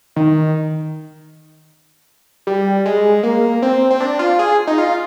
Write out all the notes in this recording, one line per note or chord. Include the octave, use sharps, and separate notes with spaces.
D#3
G3
G#3
A#3
C4
C4
D4
F4
G#4
D#4
F4